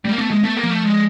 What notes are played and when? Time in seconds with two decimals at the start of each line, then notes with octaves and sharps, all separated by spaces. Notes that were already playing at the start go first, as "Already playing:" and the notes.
0.05 G3 A3
0.11 A#3
0.18 A3 B3
0.30 G#3 A#3
0.43 A3 B3
0.57 A#3
0.63 F3
0.70 A3
0.84 G#3